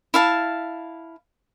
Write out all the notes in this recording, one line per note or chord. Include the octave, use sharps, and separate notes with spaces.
E4 F5 A5